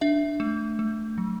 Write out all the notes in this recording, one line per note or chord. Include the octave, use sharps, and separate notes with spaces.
D4 E5
A3
A3
F#3